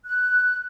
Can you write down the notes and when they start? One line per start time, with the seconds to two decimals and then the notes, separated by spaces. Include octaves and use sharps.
0.05 F#6